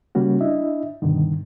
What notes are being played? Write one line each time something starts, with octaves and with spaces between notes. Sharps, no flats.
C#3 G3 A#3 C#4 F#4
D4 E4 D#5 E5
G2 B2 D3 D#3